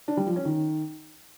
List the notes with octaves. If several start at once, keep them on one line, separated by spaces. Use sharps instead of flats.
D4
G3
F3
C#4
D#3